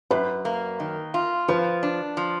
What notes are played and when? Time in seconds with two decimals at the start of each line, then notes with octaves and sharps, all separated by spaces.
0.11 F#2 B4
0.45 A#3
0.80 D#3
1.14 F4
1.48 F3 B4
1.83 D4
2.17 F3